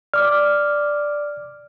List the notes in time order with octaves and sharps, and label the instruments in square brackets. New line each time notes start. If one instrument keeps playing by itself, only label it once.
[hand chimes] D5 D6 [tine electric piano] F6